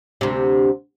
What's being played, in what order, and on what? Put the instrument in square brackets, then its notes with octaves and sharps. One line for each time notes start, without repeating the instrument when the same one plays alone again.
[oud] D2 C3